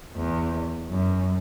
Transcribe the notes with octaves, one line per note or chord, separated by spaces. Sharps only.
E2
F#2